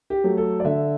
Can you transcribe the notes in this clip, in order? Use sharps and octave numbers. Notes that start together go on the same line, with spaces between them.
G4
F#3 A3
A4
D5
D3 E5